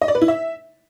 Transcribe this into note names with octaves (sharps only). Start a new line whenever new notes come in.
D#5
D5
B4
E4
E5